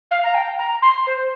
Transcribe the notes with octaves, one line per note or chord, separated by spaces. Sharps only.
F5
A#5
G5
A#5
C6
C5